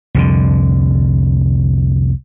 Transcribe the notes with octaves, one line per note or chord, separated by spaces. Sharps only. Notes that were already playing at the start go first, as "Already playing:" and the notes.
C2 F2 D3